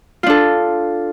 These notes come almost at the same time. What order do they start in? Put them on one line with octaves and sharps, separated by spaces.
F4 D4 A4